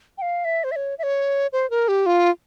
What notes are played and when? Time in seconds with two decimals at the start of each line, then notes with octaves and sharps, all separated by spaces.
0.18 G5
0.22 F5
0.45 E5
0.64 C5
0.72 E5
0.76 C#5
0.99 E5
1.03 C#5
1.53 C5
1.70 A#4
1.88 G4
2.06 F4